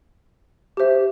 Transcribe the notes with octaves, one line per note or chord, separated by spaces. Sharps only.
G4 C5 E5